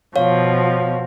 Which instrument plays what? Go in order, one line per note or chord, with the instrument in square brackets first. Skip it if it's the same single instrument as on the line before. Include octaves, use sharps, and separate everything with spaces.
[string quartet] B2 F3 [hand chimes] C#5 F5